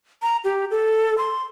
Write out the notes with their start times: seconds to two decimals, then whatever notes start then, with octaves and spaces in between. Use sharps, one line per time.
0.22 A#5
0.44 G4
0.71 A4
1.18 C6